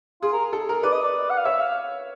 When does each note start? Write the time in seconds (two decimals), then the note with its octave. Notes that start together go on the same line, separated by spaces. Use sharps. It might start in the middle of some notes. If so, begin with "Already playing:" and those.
0.22 F4 G#4
0.33 A#4
0.53 A4
0.69 A#4
0.83 B4 D5
0.92 D#5
1.02 D5
1.30 F#5
1.38 F5
1.45 C#5 E5
1.60 F5